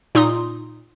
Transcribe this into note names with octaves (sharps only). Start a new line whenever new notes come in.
A#2 D#4 C6 D#6